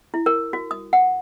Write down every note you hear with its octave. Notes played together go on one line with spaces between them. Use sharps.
E4
A#4
F#4
D#6
F#5